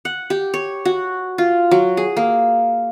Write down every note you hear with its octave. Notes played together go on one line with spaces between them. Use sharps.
F#5
G4
C#5
F#4
F4
F#3
G#4
A#3